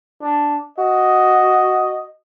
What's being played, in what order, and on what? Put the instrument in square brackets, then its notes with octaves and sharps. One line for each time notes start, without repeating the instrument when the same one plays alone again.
[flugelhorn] D4
[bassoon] F#4 [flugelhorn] D#5